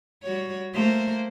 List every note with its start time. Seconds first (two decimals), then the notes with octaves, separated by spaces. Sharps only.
0.23 G3 F#4 C#5
0.73 A3 A#3 C5